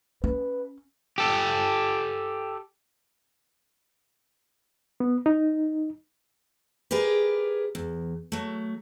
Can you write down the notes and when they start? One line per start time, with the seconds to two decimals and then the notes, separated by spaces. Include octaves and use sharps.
0.24 C#4 B4
1.18 G4 A4
5.00 B3
5.26 D#4
6.91 G4 G#4 A#4 B4 D5
7.75 E2
8.32 F#3 A3